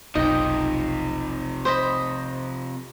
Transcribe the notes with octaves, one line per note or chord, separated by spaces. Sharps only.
F1 B1 C3 F3 D#4 D#5 G5
C5 D#5 B5